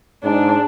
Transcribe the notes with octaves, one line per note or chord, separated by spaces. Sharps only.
G#2 D4